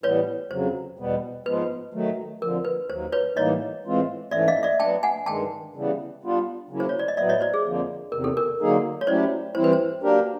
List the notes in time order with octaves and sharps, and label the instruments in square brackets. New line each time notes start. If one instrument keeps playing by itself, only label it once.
[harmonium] A2 E3 G3 B3 [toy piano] B4 C#5
[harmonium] F2 C#3 F#3 [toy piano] C5
[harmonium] E2 B2 G3 B3
[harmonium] G#2 F3 G#3 B3 [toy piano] B4
[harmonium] D#3 F#3 A3
[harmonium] F2 D3 F3 [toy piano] A#4
[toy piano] B4
[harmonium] D#2 D#3 F#3 [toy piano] C5
[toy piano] B4 C#5
[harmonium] A2 E3 G3 A#3 D#4 [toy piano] C#5 D#5
[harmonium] A2 E3 G#3 C4 F4
[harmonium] G#2 E3 A3 C#4 [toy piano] D5 E5
[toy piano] D#5 F5
D5 E5
[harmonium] F#3 B3 D4 [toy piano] G5 A5
[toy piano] F#5 G#5
[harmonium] G2 D#3 G#3 [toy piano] G5 A5
[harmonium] C#3 E3 G3 B3
G3 B3 D4 F4
C#3 F#3 A#3 C#4 E4
[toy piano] C5
C#5
D5
D#5
[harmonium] A2 F#3 B3 [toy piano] D5 E5
[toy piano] C#5 D#5
C5 D5
G#4
[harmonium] F2 D3 F3 A#3
[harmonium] E2 C3 D#3 [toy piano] A#4
[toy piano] A4
A#4
[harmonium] D3 F#3 A#3 D#4 G#4
[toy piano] C#5
[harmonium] F#3 A3 C#4 E4 G4 [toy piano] C5 D5
[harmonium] G2 E3 G3 C4 E4 [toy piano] C5
[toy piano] B4
C5
[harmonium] F#3 A#3 D4 G4 A#4